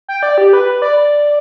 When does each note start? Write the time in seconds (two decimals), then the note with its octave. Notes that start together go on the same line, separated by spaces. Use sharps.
0.08 G5
0.23 D5
0.38 G4
0.53 B4
0.82 D5